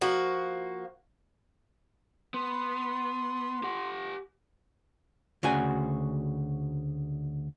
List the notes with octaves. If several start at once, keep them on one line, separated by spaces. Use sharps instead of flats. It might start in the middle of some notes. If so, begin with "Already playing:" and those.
F3 A#3 F#4
B3 C6
G4 F#5
D2 C#3 F#4 G#5